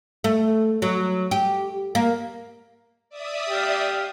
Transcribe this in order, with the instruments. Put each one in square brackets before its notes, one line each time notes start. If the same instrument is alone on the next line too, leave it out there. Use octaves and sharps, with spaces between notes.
[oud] A3
F#3
G4
A#3
[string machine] D5 E5 D#6
[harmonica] G4 F5